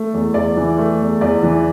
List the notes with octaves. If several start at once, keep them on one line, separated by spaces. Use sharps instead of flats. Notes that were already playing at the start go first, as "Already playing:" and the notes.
Already playing: A3
E2
E2 D5
E3
A3
E2
E2 D5
E3